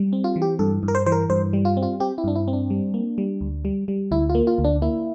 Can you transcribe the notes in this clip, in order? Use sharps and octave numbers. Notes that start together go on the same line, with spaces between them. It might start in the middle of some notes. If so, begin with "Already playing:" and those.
Already playing: G3
C4
F4
E3
G4
G2 A4
G2
A#4
C5
E3 C5
A#4
G2 C5
G3
F4
C4
F4
C4 G4
E4
G2 D4
E4
C4
D4
G3
A#3
G3
D2
G3
G3
D2 E4
F4
A#3
F4
D2
D4
A#3 E4